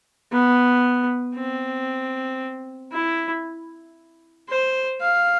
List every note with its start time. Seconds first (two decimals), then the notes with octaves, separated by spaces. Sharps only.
0.32 B3
1.36 C4
2.93 E4
4.49 C5
5.02 F5